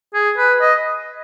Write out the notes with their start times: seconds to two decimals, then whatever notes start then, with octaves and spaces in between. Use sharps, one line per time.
0.14 G#4
0.38 B4
0.61 D#5